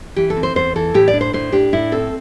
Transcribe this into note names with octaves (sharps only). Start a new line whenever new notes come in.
E3 G4
A4
C4
C5
E2 C5
E3 A4
A2 G4
D5
D4
C5
A2 C5
D4 G4
A2 E4
C4 A4